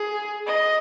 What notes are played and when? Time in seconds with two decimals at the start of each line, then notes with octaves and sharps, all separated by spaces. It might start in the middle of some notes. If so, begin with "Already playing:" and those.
Already playing: G#4
0.47 D#5